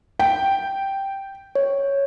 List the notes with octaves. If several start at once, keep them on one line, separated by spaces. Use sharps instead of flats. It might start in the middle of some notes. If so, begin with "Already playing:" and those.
G5
C#5